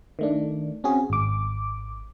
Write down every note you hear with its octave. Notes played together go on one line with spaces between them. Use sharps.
D#3 A3 D4
C4 C#4 F#4 G#4
G#1 D6